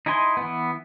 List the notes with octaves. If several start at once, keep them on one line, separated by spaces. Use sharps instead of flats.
D#4 E4 D#5 G#5 C6
E3 B3